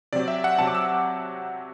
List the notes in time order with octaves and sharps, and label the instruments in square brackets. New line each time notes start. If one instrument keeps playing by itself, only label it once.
[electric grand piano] C3 F#3 C4 D5
E5
F#5
C3 F#3 C4 A5
D6
E6